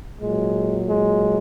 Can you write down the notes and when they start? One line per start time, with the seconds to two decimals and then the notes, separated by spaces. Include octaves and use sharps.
0.19 A#2 F#3 G#3
0.86 G#3